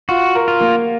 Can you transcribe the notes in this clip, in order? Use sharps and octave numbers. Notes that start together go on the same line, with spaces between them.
F4 F#4
A#4
F4
A#3